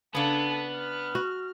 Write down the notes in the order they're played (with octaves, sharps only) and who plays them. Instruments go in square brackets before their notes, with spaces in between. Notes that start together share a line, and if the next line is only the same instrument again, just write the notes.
[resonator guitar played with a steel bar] C#3 D4 [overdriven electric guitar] B3 [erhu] A4
[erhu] F6
[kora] F#4